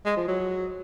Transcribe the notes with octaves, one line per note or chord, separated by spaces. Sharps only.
G#3
F3
F#3